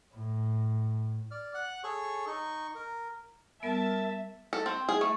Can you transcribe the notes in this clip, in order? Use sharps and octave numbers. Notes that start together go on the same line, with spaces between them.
A2
D5 F6
F#5 F#6
G#4 A4 C#5 C#6
D#4 C#6
A#4
G3 B3 A#4 E5 A5
A4
C4
G#4
A3